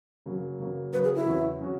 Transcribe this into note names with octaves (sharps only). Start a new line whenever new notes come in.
F#2 C#3 F#3 A#3
F#2 C#3 F#3 A#3
F#2 C#3 F#3 A#3 B4
G#4
E4
E2 C#3 F#3 C#4 F#4
C#3 F#3 C#4 F#4